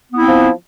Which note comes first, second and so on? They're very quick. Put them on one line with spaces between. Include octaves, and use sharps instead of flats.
B3 E4 C4 F3